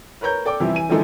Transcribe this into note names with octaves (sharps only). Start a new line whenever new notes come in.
A#4 B4 C#5 A#5 G6
A4 D5 G5 D6
C3 E3 F3 G3 E4 G4
E3 G#5 D#7
D3 E3 F3 G#3 D#4 A4